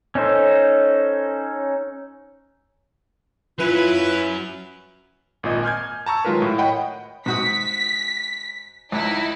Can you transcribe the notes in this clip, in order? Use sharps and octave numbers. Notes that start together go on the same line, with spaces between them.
C#4 D#4 A4 C5
F#3 C#4 E4 F4 B4
G#1 A#2 D#5
G#5 F6 G6 G#6
A5 A#5 C#6 E6
D#3 F#3 G#3 F4 A#4 B4
A2
A#4 C#5 D#5 F#5 G5 B5
G#2 F#4 D#6 B6
C#2 D#4 E4